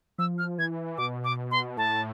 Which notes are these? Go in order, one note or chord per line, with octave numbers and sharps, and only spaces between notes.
F3 E6
F6
E3 G#6
B2 D6
D6
C6
A2 A5